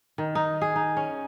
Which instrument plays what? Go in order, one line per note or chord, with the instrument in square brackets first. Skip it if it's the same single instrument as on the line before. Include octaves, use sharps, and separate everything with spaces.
[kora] D#3
D#4
G#4
D#4
C#4